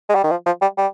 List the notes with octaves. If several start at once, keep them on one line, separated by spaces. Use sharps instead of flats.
G#3
G3
D#3
F3
F3
G3
G3